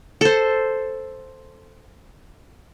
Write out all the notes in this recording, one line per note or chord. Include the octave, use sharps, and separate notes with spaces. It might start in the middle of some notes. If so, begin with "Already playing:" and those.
A4 C5